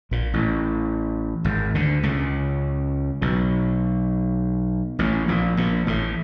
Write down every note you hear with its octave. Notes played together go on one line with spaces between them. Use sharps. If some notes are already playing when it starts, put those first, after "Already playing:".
A#1 A#2
A1 A2
G#1 G#2
D2 D3
C#2 C#3
B1 B2
A1 A2
A#1 A#2
A#1 A#2
A1 A2